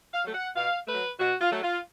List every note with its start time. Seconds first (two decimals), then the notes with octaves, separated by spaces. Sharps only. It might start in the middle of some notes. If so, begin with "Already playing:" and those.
0.14 F5
0.24 F#3 A3
0.34 F#5
0.56 B2 F5
0.88 F#3 A3 B4
1.20 B2 F#4
1.41 F4
1.52 F#3 A3
1.63 F4